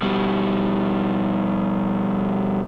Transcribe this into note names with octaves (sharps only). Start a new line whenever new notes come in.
B2 G3